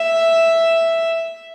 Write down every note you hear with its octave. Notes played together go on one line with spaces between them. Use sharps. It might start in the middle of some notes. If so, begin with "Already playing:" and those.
Already playing: E5